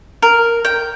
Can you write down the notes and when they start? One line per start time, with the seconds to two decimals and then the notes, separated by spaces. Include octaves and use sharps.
0.23 A#4
0.65 G5